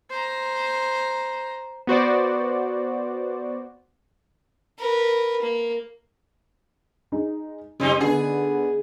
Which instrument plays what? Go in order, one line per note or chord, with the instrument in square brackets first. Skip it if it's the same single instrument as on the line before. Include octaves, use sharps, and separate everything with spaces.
[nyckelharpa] C5 A#5
[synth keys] B3 F#4 C5 D5
[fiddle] A#4 B4
A#3
[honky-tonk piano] G#3 D#4
[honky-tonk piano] F#1 [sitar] G3 C4 D#4
[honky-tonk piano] D3 B3 [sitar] G#4